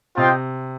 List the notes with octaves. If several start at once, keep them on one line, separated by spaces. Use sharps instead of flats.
C3 F4 C5 D#5 G5